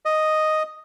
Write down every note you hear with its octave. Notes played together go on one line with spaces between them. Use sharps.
D#5